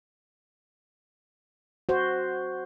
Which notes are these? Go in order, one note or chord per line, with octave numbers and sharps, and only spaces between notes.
F#4 C5